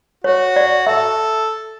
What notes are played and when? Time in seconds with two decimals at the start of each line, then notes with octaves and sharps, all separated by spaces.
0.24 F#4 C#5
0.56 D5
0.87 A4 E5